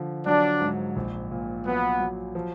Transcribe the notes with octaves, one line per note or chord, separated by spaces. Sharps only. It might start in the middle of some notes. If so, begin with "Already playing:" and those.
Already playing: D3 F3
F#3 D4
G#2
A#1
A#2
F#3 B3
F#3
F3